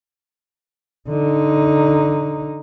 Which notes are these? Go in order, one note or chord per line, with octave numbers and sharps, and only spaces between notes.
D3 D#4